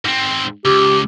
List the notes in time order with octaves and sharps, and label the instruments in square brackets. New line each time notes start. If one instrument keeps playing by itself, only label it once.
[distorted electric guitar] G#2 C4
[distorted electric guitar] C#2 [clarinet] G4